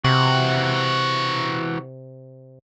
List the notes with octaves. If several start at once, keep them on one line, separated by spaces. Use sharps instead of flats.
C3 E3 F#4